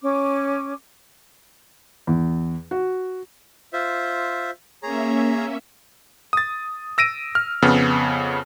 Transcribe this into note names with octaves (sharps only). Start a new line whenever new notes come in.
C#4 D6
E2
F#4
F4 C5 E5
A#3 C#4 G#4 C#5 E5 A#5
D#6 A6
E6 A#6 D7 D#7
F6
F2 C#3 B3